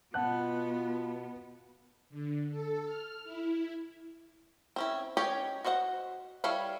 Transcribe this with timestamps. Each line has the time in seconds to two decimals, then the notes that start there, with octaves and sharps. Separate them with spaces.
0.14 B2 B3 F4 F#5 A5 F#6
2.10 D3
2.50 A4
2.85 F6
3.24 E4
4.76 C4 C#4 E4
5.17 C#4 G4 C#5 D#5 G#5
5.65 F#4 C5 D#5 F5 F#5
6.44 G3 E4 A4 C#5 F5